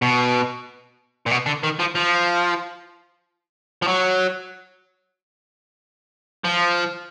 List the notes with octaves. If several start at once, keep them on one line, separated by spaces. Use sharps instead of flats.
B2
A#2
B2
D3
D#3
F3
F3
F3
F#3
F3